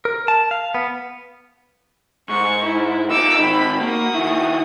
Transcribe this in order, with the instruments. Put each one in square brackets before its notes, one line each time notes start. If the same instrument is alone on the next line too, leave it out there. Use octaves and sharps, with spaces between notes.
[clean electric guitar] A#4
A5
F5
B3
[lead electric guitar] G#2 [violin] C#6
[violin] E4
[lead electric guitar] D#4 F4 [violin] D6 E6
[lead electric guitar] G#2 D#3 [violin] B5
[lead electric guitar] A#3 [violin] F#4 D#6
[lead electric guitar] D#3 E4